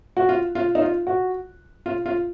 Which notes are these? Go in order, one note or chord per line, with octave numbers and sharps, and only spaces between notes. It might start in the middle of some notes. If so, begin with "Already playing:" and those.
F#4
F4
F4
D#4
F4
F#4
F4
F4